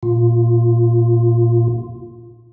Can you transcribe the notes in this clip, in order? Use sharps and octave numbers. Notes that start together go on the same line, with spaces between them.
A#2 F4